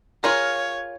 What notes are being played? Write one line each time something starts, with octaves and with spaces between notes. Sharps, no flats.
F4 G#4 A#4 C#5